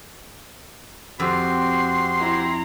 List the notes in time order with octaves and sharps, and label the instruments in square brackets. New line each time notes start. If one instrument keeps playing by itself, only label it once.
[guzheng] F2 [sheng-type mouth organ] C4 F#4 G4 [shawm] C6
[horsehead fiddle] E4 A#5